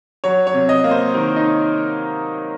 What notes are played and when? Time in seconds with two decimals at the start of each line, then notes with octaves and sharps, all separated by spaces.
0.24 F#3 C#5
0.47 C#5
0.54 C3
0.69 D#5
0.84 A#3
0.91 C5
1.14 D#3 A#4
1.36 D#4